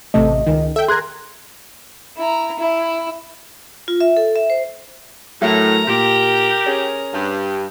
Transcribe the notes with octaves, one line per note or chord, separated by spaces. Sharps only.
A1 C3 A3 D#5
C#2 D#3
A4 E5 G5
G#4 A#4 C6 F#6 G#6
E4 A#5
E4
F4
E5
A4
E5
C5
A2 F#3 A3 A#4 A#5
A#2 G4
C#4 G#4
G2